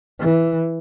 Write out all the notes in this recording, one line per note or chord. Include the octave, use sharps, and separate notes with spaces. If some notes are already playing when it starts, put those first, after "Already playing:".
E3